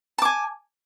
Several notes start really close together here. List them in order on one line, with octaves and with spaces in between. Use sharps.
A5 D6 G#5